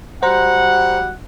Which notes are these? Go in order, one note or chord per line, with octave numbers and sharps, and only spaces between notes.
G3 F#4 C5 F#5 A#5